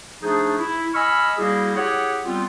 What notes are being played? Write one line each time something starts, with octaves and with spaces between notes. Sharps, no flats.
F3 A3 D4 D#4 G#4
E4
D#5 G#5 B5 C#6 E6 F6
G3 A#3 E4 F#4 G#4
E4 G4 G#4 C#5 F#5
G3 B3 C4 F4